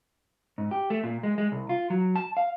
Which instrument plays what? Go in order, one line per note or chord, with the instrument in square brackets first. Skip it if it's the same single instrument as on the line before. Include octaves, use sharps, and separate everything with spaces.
[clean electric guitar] G#2
G4
A3
A#2
G#3
G#3
C2
F4
F#3
A5
F5